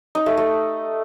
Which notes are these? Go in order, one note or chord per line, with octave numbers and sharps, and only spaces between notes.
D#4
A3
A3